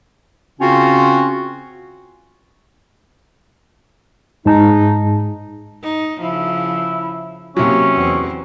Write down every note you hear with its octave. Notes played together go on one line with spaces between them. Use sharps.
C#3 C4 C#4 F4 F#4
G#2 G#3 D#4 A5
D#4
C#3 F3 E4
C3 F#3 A#3 C#4
E2 C4